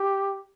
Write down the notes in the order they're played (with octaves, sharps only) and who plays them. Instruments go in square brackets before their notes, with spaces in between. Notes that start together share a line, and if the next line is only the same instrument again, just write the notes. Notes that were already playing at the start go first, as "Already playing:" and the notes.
Already playing: [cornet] G4